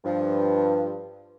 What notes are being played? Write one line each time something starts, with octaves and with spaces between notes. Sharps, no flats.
G2 F3